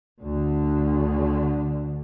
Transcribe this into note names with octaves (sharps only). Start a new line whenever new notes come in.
D2 D3